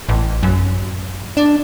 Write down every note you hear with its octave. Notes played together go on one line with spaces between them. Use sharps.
A1
F#2
D4